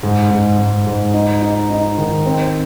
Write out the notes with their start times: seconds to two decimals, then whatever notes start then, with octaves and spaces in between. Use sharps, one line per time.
0.03 G#2
0.31 G#2
0.58 G#2
0.87 G#2
1.14 D#4
1.42 D#4
1.70 D#4
1.98 D#3
2.26 C4